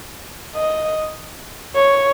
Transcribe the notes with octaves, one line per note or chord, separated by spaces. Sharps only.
D#5
C#5